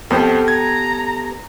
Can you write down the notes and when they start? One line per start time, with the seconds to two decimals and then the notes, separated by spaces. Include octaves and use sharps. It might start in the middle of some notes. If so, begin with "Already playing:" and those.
0.10 F2 B3 G4 A4 C5
0.48 A#5 G#6